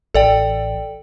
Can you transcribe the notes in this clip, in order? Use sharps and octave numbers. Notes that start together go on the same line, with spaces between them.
A1 A4 D5 G5